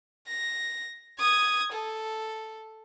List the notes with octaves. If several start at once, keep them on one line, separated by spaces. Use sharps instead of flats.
A#6
D#6 G#6
A4